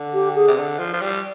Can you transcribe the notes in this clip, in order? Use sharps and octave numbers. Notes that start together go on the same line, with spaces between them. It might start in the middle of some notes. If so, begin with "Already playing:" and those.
Already playing: D3
G4
G#4
C3
D3
F3
F3
G3